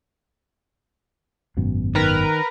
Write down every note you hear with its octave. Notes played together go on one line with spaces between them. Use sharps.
G#1 F#2 B2
D#3 A#4 B4 A#5